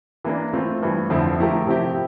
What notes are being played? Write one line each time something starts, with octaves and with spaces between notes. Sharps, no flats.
E3 A#3 D4
E3 A3 C4 F4
G2 E3 A3
F2 D3 F3 C4 E4
F3 A3 E4 G4 A#4
C3 F3 C4 E4 G4